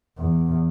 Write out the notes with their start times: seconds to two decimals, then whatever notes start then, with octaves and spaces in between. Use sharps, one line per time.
0.18 E2